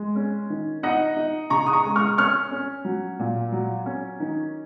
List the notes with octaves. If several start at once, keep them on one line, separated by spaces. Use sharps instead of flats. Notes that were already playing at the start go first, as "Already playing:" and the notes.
Already playing: G#3
C#4
D#3
D#4 D#5 F#5
D#4
C#3 A#5 C#6
D#6
A#5 C#6
G#3
C#6 F6
C#4 C#6 F6
C#4
F#3
A#2
F#3
C#4
D#3